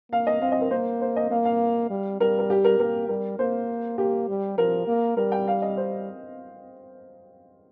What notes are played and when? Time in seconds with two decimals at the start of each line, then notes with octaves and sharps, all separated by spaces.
0.12 A#3 F5
0.27 D#5
0.42 C4 F5
0.52 D#5
0.61 A#4
0.71 A#3 C5
1.01 C5
1.16 D#5
1.31 A#3 F5
1.45 F5
1.90 G3
2.20 G3 A#4
2.39 A#4
2.50 G4
2.64 A#4
2.79 A#3 A#4
3.09 G3 A#4
3.39 A#3 C5
3.98 A#3 G4
4.29 G3
4.58 F3 A#4
4.87 A#3
5.17 G3 A#4
5.32 G5
5.48 F5
5.62 D#5
5.77 C5